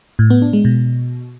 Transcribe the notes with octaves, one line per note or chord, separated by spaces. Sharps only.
A2
B3
D4
G#3
B2